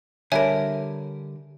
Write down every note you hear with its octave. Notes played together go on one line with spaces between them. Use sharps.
D3 G3 A#4 C#5 E5 G#5